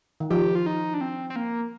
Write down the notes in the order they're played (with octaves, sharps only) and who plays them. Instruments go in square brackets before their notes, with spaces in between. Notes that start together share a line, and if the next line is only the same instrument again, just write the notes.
[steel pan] D#3
[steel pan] F3 [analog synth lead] G4
[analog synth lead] F4
D#4
D4
C4
C4
A#3